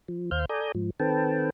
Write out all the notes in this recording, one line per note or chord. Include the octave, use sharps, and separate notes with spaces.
F3
D#2 C5 F5 F6 G6
A4 D5 G#5 A#5 D#6 G6
G#2 F3
D#3 C4 A4 B4 G5 A5